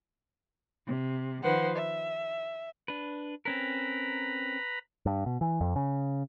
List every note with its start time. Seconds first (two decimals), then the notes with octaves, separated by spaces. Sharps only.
0.87 C3
1.42 D#3 F3 B4 C5 F#5
1.76 E5
2.88 D4 B4
3.45 C4 C#4 A#4 B4 A#5 B5
5.06 G2
5.26 B2
5.41 E3
5.61 F2
5.76 C#3